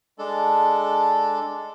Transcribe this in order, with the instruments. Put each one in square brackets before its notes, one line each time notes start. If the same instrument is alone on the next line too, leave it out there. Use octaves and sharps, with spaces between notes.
[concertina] G#3 D4 A4